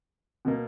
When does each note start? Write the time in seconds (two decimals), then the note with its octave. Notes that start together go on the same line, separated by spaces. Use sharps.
0.45 B2 A#3